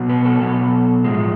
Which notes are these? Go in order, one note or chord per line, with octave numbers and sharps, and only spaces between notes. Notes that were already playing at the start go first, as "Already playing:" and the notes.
Already playing: B2 F#3 B3
B4
A4
B2 F#3 B3
A2 F3 G#3